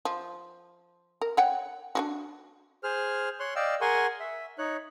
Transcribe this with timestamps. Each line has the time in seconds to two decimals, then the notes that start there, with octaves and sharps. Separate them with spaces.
0.05 F3
1.21 A#4
1.37 C#5 F#5 G5
1.95 D4 E4 F#4
2.84 G#4 C5 F6
3.40 C#5 C6 F#6
3.56 D5 D#5 F5 G5 E6
3.81 G#4 A#4 F#5 G#5 C6 C#6
4.20 E5
4.58 D#4 C#5 F#6